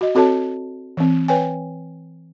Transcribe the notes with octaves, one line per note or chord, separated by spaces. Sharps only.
F#4 D#5
C4 F#4 A4 C#5 A5
E3 C4
B4 C#5 G5 G#5